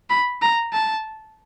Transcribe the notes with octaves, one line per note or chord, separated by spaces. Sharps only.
B5
A#5
A5